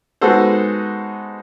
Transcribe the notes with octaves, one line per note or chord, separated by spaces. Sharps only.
G#3 B3 D#4 F#4 A4 C5